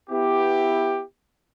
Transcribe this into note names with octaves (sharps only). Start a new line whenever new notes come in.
B3 E4 G4